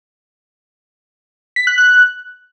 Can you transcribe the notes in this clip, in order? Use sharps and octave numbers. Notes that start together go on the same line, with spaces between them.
B6
F#6
F#6